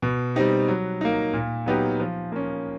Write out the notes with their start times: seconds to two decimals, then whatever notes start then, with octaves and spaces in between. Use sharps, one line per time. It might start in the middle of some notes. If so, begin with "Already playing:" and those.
0.02 B2
0.35 G3 C4 D#4 G4
0.68 F#3
1.01 A#3 D#4
1.33 A#2
1.66 F#3 B3 D#4 G4
2.00 F3
2.32 A#3 C#4